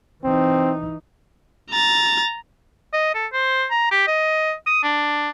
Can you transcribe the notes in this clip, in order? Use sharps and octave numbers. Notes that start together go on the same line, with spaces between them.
E3 C4 D#4
A#5 A6
D#5
A4
C5
A#5
G4
D#5
D#6
D4